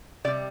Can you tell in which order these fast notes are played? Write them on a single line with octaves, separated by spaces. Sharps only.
C3 D5 G3